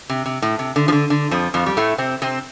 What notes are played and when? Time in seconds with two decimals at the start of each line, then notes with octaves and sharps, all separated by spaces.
0.10 C3
0.26 C3
0.42 A2
0.59 C3
0.76 D3
0.88 F3
0.92 D3
1.10 D3
1.31 F2 F3
1.54 F2 F3
1.66 G3
1.77 A2 A3
1.98 C3 C4
2.22 C3 C4